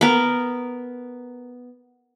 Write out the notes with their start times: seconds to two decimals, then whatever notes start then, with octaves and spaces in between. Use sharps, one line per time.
0.01 B3 A#4